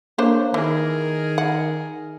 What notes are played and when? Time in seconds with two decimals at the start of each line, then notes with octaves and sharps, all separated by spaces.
0.18 A#3 D4 C5 C#5
0.54 D#3 E3 G#4 A#4
1.38 F#5